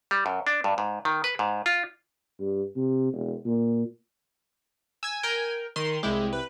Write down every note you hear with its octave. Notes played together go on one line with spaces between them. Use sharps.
G3
F#2
D4
G2
G#2
D#3
B4
G#2
F4
G2
C3
E1
A#2
G#5 E6 G#6
A#4 G5
D#3 C6
C2 G#3 E4 G4
B4